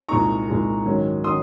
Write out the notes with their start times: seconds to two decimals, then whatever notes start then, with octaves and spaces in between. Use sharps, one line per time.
0.09 C2 A#2 G#3 D#4 A#5 C#6
0.47 C2 A#2 G#3 D#4
0.86 G#2 D#3 F#3 C#4
1.24 D#3 F#3 C#4 C6 D#6